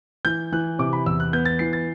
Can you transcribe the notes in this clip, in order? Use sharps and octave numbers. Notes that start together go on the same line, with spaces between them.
E3 G6
E3 F#6
C3 D6
B5
E2 E6
F#6
B3 G6
A6
E3 C7
A6